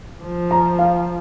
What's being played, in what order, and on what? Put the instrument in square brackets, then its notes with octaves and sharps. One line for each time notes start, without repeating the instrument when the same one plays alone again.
[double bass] F3
[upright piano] A#5
F5